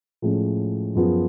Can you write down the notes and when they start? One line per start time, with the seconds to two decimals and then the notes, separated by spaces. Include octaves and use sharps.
0.22 A2 F3 G#3 C#4 G#4
0.95 F#2 F3 B3 F4 G#4